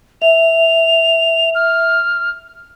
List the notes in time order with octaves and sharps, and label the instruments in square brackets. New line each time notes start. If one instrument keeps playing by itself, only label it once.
[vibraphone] E5 [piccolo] F7
[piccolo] F6